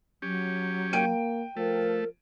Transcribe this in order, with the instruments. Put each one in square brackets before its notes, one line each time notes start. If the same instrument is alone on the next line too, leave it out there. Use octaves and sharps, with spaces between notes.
[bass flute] F#3 [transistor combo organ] C#4 G4
[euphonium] A#3 [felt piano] G5 D7 D#7
[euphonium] F3 [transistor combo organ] A3 [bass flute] A#4